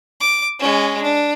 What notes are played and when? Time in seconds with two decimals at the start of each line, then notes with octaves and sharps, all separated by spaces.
0.20 D6
0.59 G#3 C#4
1.02 D4